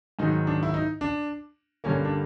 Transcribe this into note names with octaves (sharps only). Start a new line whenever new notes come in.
G#2 D#3 F#3 D#4
D4
E4
D#4
D4
G2 D3 G3 A#3 C#4
D4